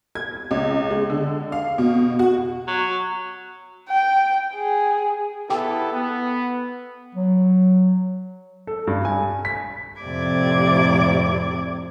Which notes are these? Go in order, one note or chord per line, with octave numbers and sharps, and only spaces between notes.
G#6
C#2
G#3
D3
F5
B2
F#4
F#3
G5
G#4
B3 E4 G4 A4 G5
B3
F#3
A4
G2
G#5
B6
F2 A2 C3 D5 D6 G#6